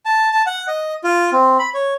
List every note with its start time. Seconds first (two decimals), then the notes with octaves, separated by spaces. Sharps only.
0.05 A5
0.32 A5
0.46 F#5
0.68 D#5
1.04 F4
1.33 C4
1.59 B5
1.74 C#5